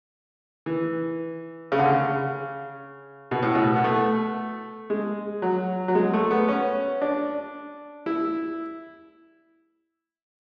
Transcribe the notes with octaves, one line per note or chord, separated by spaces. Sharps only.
E3
C#3
D3
C#3
B2
A2
B2
B3
A3
G#3
F#3
F#3
G#3
A3
B3
C#4
D4
E4